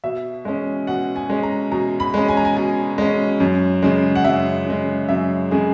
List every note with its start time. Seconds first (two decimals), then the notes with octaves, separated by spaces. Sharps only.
0.04 B2 E5
0.45 G#3 C#4
0.87 B2 F#5
1.16 G#5
1.30 G#3 C#4
1.43 A#5
1.72 B2 A#5
2.00 B5
2.14 G#3 C#4
2.28 G#5
2.37 A#5
2.45 G#5
2.57 B2 G#5
2.98 G#3 C#4
3.40 F#2
3.82 C#3 G#3
4.15 F#5
4.24 F#2 E5
4.66 C#3 G#3
5.09 F#2 E5
5.51 C#3 G#3 G#4